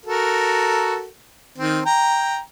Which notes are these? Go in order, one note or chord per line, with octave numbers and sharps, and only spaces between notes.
F#4 A4 A#4
D#3 C4
G5 A#5